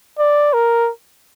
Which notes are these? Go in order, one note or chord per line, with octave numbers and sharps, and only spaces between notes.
D5
A#4